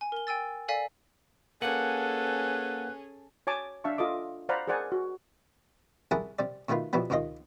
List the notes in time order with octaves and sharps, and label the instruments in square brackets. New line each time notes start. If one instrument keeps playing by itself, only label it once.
[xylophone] G#5
A#4 G7
G5 G#5 E6 A6
A4 D5 F5 G#5 B6
[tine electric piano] A#3 F#5 F#6 [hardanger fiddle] C#4 G#4 [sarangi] A4 [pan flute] B4
[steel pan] C#5 G#5 A5 D6
D4 E5 F5 A5 C#6
F4 A4 D#5 D6
C5 D5 F5 F#5 A#5 B5
G#4 A#4 C5 D5 F#5 G#5
F#4
[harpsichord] C2 E4 G#4 A#4 F#5 A5
C3 G3 D5
B2 D#3 A3 B3 F4
B2 E3 F3 G3 B3
C#2 C3 D#3 F4 D#5